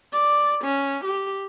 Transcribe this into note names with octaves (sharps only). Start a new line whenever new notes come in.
D5
C#4
G4